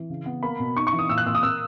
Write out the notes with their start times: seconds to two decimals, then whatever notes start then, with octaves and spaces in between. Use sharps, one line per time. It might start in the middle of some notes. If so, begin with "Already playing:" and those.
Already playing: E3
0.10 C#3
0.26 B3
0.43 A#3 B5
0.59 B2
0.76 D#4 C#6
0.87 C#6
0.93 E3
0.99 D#6
1.10 A#2 E6
1.18 F#6
1.26 A#2 E6
1.35 D#6
1.43 A#3 E6